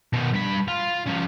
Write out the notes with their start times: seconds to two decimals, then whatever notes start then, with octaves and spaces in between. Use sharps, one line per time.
0.13 B2 D#3
0.34 G2 B5
0.68 F4
1.06 F3 C#4